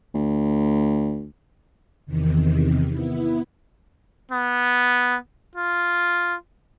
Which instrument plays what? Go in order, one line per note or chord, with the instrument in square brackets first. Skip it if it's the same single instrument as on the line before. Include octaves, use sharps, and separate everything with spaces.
[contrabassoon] D2
[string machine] E2 C3 D#3
B3 E4
[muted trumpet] B3
F4